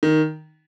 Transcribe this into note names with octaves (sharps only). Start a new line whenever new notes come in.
D#3